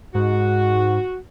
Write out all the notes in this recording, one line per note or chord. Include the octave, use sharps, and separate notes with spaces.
G#2 F#4